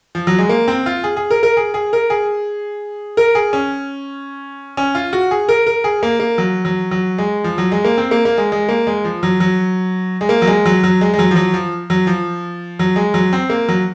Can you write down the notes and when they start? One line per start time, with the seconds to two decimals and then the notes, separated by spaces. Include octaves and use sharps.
0.15 F3
0.27 F#3
0.39 G#3
0.49 A#3
0.68 C4
0.86 F4
1.04 G#4
1.16 G#4
1.30 A#4
1.43 A#4
1.57 G#4
1.74 G#4
1.93 A#4
2.10 G#4
3.17 A#4
3.35 G#4
3.53 C#4
4.77 C#4
4.95 F4
5.13 F#4
5.31 G#4
5.49 A#4
5.66 A#4
5.84 G#4
6.03 A#3
6.20 A#3
6.38 F#3
6.65 F#3
6.91 F#3
7.18 G#3
7.44 F3
7.58 F#3
7.72 G#3
7.85 A#3
7.98 C4
8.11 A#3
8.25 A#3
8.38 G#3
8.52 G#3
8.69 A#3
8.87 G#3
9.05 F3
9.23 F#3
9.40 F#3
10.21 G#3
10.29 A#3
10.42 F#3
10.48 G#3
10.66 F#3
10.84 F#3
11.01 G#3
11.14 G#3
11.19 F#3
11.31 F3
11.36 F#3
11.54 F3
11.90 F#3
12.07 F3
12.79 F#3
12.96 G#3
13.14 F#3
13.33 C4
13.50 A#3
13.68 F#3